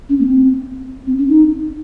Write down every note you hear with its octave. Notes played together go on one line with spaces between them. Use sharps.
C#4
A#3
C4
C4
C#4
D#4